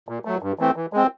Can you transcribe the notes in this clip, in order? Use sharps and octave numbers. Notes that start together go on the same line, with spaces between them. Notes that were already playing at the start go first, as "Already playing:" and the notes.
A#2
F#3 A3
G2
E3 A3 C4
E3
G#3 C4